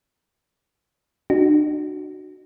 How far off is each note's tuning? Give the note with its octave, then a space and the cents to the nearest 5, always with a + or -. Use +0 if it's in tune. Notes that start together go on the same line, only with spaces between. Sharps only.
D4 +40 F#4 +0